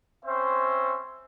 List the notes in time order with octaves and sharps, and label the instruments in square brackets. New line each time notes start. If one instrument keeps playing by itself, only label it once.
[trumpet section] C4 C#4 C5 E5